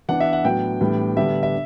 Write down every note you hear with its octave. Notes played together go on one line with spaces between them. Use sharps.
E3 B3 D4 F#5
E5
F#5
A2 F#3 B3 D4 G5
A2 E3 G3 B3 D4
D3 G3 B3 D4 E5
E5